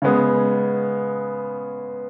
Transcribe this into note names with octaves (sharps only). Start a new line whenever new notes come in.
C#3 G#3 B3